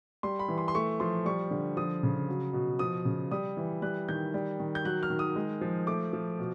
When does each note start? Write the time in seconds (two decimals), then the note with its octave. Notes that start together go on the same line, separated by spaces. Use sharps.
0.23 G3 C6
0.39 B5
0.48 E3
0.58 C6
0.68 C6
0.75 A3 C#6
1.00 F3 C6
1.26 G3 C#6
1.51 D3
1.77 F3 D#6
2.03 C#3
2.29 F#3
2.53 B2
2.79 F3 D#6
3.05 C#3
3.31 G3 D#6
3.57 E3
3.82 G3 F#6
4.09 D#3 G6
4.34 G3
4.60 D#3
4.75 G6
4.85 F#3 F#6
5.03 F6
5.10 D#3
5.19 D#6
5.36 G#3
5.61 F3
5.87 A3 D6
6.13 F3
6.39 B2